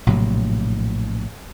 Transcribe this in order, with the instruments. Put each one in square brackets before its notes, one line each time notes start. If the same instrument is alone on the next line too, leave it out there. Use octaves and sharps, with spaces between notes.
[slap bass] A#1 A2 C3 F#3